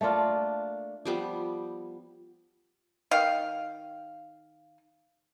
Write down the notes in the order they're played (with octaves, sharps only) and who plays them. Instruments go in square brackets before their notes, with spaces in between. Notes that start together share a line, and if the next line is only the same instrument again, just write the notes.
[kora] A3 A#3 D4 F4
[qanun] F3 G3 B3
[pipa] D#3 F5